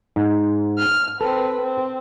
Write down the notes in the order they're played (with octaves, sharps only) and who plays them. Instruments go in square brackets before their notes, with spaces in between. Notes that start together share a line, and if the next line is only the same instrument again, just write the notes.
[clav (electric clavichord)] G#2
[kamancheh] F6
[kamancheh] C4 B4 [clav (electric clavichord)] A4
[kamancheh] C4